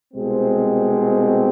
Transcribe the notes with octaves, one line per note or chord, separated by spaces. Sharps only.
C2 B2 G#3 C4